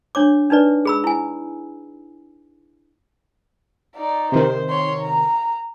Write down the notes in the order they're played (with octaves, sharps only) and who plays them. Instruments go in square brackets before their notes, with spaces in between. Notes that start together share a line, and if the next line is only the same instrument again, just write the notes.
[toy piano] D4 C#5 D6
D4 D#4 B4 D5
G#4 B5 E6
E4 G#5
[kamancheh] D#4 D5
[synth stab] C3 D#3 [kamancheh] C5
[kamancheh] C#5 C6
A#5